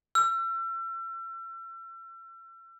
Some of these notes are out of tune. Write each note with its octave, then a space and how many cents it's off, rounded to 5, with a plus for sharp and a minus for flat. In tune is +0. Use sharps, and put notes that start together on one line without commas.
E6 +40